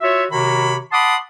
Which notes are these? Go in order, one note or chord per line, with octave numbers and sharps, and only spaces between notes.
F4 F#4 C#5 E5
C3 D#3 F#4 C#5 A#5 B5
F#5 A5 B5 C6 D6 D#6